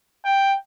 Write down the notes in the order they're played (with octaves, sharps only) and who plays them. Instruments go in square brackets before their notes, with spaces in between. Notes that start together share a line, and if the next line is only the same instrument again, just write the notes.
[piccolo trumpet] G5